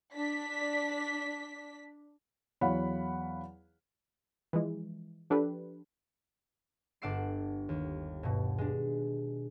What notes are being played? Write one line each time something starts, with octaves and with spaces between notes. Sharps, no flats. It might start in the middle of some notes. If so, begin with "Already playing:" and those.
D4 B6
E2 F#3 C#5 F5 F#5 B5
E3 F3 G#3
F3 D4 G4 A4 B4
G1 D4 F#5 D6 E6 C7
D#2
G2 B2
G#3 D4